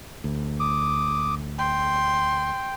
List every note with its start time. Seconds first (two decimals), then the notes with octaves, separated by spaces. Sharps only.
0.24 D2
0.60 D6 D#6
1.59 G5 C6